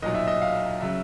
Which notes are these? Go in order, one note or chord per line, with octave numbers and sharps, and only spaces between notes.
B1 A#2 F#3 D#5
E5
D#5
F5
C#3 F#3 E5